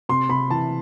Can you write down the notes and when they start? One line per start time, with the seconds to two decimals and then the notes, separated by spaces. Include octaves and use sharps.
0.09 C3 C6
0.29 C3 B5
0.51 E3 A5